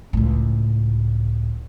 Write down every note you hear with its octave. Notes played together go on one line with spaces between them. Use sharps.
C#2 A2